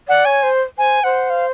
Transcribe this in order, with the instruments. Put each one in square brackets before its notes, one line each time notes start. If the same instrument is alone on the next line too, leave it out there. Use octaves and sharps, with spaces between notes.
[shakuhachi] D5 [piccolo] F#5
[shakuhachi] C#5 [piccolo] G#5
[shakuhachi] C5
[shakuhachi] C5 [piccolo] G#5
[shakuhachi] C5 [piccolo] F#5
[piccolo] F5